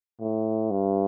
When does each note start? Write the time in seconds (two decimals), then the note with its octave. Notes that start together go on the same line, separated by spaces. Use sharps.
0.20 A2
0.71 G2